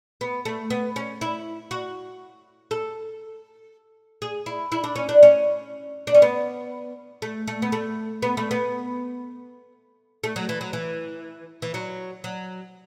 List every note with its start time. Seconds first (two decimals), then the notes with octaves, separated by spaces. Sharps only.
0.21 B3
0.45 A3
0.70 B3
0.96 C#4
1.21 E4
1.71 F#4
2.71 A4
4.22 G#4
4.46 E4
4.72 E4
4.84 D4
4.96 C#4
5.09 D4
5.23 C#4
6.07 D4
6.15 C#4
6.22 B3
7.22 A3
7.47 A3
7.62 B3
7.72 A3
8.22 B3
8.37 A3
8.51 B3
10.24 A3
10.36 F#3
10.49 E3
10.61 F#3
10.73 E3
11.62 E3
11.74 F#3
12.24 F#3